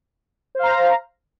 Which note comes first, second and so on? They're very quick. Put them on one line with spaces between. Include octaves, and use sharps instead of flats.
C5 F5 A#5